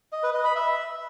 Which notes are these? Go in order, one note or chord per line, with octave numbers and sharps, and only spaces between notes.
D#5
B4
D#5
B5
E5